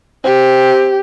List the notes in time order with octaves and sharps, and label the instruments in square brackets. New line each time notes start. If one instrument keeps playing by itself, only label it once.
[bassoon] C4 [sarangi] G4